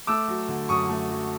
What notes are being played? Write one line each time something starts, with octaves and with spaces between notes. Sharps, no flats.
A3 D6 E6
F#3
D3
F#2 C#6 D#6
A3
F#3